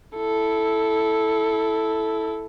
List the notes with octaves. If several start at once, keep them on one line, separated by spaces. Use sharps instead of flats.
E4 A4